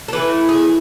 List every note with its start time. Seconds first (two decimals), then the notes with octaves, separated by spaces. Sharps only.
0.08 A4
0.13 E3 A3 E4 B4
0.49 G#4